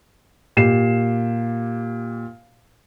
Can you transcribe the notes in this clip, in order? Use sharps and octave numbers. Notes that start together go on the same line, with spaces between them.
A#2 G4 C7 E7